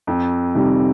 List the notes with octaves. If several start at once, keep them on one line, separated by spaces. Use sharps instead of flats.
F2
C3 D#3 G3